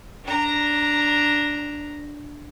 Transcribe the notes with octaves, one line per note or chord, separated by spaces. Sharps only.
D4 A#5